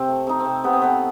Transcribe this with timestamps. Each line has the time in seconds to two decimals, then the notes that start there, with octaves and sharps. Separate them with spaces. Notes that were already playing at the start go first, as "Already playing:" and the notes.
Already playing: C3 C4
0.08 A3
0.27 C3 D#4
0.40 C4
0.45 C3
0.64 C3 B3
0.73 C4
0.82 A3 B3